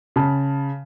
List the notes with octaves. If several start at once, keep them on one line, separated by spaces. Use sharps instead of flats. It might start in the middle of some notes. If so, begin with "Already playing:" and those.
C#3 A5